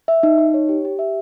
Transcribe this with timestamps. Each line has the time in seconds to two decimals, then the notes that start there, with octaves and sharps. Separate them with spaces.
0.08 E5
0.23 D#4
0.38 D#4
0.54 C#5
0.69 G4
0.85 G4
0.99 E5